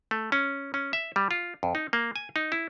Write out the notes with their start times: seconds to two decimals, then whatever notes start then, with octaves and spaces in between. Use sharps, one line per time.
0.11 A3
0.32 C#4
0.74 C#4
0.93 E5
1.16 G3
1.31 F4
1.63 F2
1.75 D#4
1.93 A#3
2.16 G#5
2.36 D#4
2.52 E4